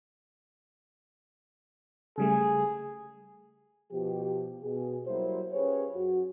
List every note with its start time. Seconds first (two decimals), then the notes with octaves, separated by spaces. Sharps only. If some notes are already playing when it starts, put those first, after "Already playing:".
2.18 C#3 G3 A3 G#4
3.92 B2 F3 G4
4.62 B2 G#4
5.06 F#3 G3 A#3 E4 C5
5.52 C#4 F4 G4 G#4 B4 C#5
5.95 F#2 F#4